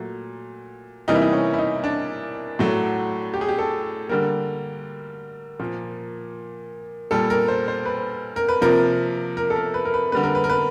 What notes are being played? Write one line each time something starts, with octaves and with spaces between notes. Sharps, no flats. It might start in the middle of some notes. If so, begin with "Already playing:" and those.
Already playing: A#2 F#3 A3
C3 E3 G3 A#3 D#4
E4
D#4
C#4
E4
D#4
D4
A2 F#3 A3
G4
G#4
G4
A4
D3 G3 A#3 A#4
A#2 F3 A#3
A#2 G3 A#3 A4
A#4
C5
C5
B4
A#4
B4
C3 F3 A#3 A#4
A#4
A4
A#4
B4
A#4
B4
D3 G3 A#3 B4
A#4
B4
A#4
B4